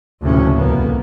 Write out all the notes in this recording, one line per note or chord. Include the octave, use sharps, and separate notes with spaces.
F#1 D2 A2 C3 F3 C#4
C2 F2 A#3 B3